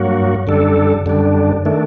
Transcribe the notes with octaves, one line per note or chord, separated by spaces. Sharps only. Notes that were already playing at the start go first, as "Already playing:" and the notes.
Already playing: G2 F#3 A#3 F#4
F#2 D3 G3 D4 A4
F#2 D3 G3 D4
D#3 A3 D4